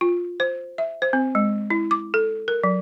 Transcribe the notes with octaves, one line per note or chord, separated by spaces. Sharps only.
F4
C5
E5
C5
C4
G#3
E4
D6
A4
A#4
F#3